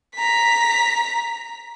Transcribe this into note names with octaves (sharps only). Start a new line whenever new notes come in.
A#5 B6